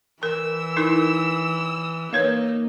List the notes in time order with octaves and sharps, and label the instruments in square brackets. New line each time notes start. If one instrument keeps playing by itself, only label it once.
[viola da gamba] E3 [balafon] A#4 [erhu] E6
[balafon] D#4 E4 A#4
[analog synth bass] A#3 [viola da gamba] D#4 [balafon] B4 C#5 F5